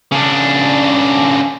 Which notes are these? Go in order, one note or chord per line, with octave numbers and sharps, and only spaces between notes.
C#3 D4